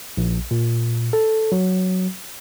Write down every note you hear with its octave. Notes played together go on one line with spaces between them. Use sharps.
A#1
A#2
A4
F#3